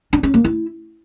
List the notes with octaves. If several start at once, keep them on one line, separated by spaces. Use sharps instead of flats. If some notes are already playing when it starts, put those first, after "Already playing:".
D4
C#4
A#3
E4